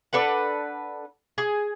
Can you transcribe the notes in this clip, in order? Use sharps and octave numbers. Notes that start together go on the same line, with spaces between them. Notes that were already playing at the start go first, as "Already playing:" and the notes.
D4 A4 B4 F#5
G#4